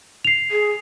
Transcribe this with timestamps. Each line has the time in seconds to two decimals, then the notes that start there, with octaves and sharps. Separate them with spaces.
0.25 C7 F7
0.51 G#4